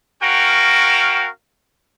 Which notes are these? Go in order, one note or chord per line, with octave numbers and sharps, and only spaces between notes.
C#4 F#4 A#4 F5 G5